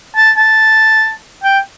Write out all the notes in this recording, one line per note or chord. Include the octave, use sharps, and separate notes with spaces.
A5
A5
G5